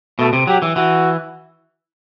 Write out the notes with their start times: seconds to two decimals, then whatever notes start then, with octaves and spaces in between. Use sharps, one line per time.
0.19 B2 A3
0.33 C3
0.47 F#3 G4
0.62 E3
0.76 E3 F#4